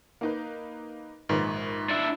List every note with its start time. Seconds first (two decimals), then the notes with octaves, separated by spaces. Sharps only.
0.21 A#3 D#4 B4
1.29 A#1 G#2 D#3 B4
1.89 D4 E4